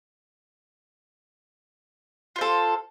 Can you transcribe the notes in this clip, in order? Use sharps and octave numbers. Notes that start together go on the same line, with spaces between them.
F4 A4 C5